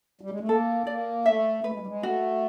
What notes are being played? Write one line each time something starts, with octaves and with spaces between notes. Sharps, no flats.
G3
G#3
A3
A#3 A4
A#3 D5
A3 E5
A3 B4
G#3
G3
G#3
A3 F#4